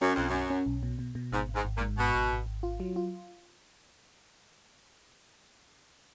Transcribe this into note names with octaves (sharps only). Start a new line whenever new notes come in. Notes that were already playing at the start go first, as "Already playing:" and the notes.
F#2 C#4
B1 F2
F#2
C#4
C#4
B1
B2
B2
B2
G#1 G#2
G#1
G#2
G#1
A#2
G#2
G#1 B2
G#1
G#1
G#1
F4
F#3
F4